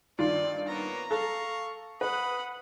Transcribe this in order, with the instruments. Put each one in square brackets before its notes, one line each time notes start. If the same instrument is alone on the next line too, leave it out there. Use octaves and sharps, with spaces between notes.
[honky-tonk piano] G2 D#3 F4 [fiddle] D5
[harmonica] A#3 B3 C#5 [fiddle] A#5
[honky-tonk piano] A4 [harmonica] F5 C#6
[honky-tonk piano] B4 [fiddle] F#5 B5 [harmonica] D#6